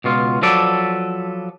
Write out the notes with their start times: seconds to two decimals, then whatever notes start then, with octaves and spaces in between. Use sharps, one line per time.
0.04 C#2 B2 F4
0.42 F3 F#3 A4 B4 D5